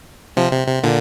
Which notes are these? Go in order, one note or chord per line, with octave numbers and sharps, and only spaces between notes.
C3 F3
C3
C3
A#2 D3